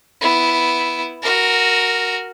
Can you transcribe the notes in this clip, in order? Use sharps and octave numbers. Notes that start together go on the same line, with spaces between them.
B3 E4
F#4 A#4